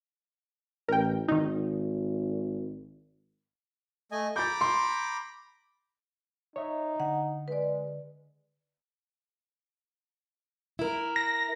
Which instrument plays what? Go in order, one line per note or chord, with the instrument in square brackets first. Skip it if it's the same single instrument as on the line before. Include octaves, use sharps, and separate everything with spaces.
[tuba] A1 [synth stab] A#4 G5
[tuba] G#1 [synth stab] D#3 D#4
[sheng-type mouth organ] A3 D#5 G#5
[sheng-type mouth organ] A#5 B5 D6 [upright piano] G6 A6
[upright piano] C6
[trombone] D#4 [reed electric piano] C#5 E5
[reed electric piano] D3 [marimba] F#5
[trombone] G#3 [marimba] B4 D5
[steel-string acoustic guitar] E4 A#4
[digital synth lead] A#6